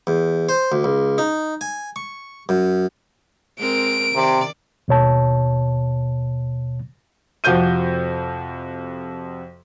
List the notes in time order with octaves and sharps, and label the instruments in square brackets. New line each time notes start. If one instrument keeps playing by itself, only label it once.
[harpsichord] E2
C5
D2
C#2
D#4
G#5
C#6
F#2
[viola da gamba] G#3 C4 A#4 [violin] D7
[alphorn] C3 [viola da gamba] D#3 D5
[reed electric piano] D#2 B2 C#5 A5
[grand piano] F2 C3 F3 F#4 G6 D#7